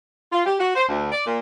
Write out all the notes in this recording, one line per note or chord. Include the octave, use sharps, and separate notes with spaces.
F4
G4
F#4
C5
D2
D5
A#2